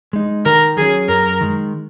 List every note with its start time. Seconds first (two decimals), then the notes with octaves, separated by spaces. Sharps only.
0.13 G#3 D#4
0.45 D#3 A#4
0.77 F#3 C#4 G#4
1.08 F#2 A#4
1.41 D#3 G#3